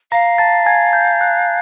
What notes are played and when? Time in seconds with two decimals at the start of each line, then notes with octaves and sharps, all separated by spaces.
0.11 F5 A#5 A#6
0.38 A5 A6
0.66 G#5 G#6
0.93 G6
1.21 F#6